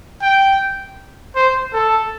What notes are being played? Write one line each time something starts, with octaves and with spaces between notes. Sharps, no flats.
G5
C5
A4